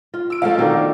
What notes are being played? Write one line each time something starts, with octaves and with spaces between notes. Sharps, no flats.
F4
E6 D7
F3 A3 C4 C#4 A4 F5
B2 D#3 D4